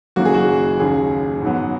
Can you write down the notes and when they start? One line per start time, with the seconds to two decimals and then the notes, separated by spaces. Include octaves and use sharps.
0.16 F#1 F#2 D#3 F#3 A#3 F#4
0.25 G#4
0.34 F#4
0.79 D#2 C#3 F#3 G#4
1.42 G#2 D#3 F#3 B3